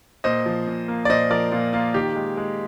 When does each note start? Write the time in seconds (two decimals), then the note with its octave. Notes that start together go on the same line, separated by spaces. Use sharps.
0.24 A#2 C5 D#5
0.46 F3
0.67 A#2
0.88 A#3
1.05 D5
1.09 A#2 C5 D#5
1.30 F3 A#4 D5
1.51 A#2 F4
1.73 A#3 F4
1.94 D#3 G4
2.15 G#3
2.37 G#3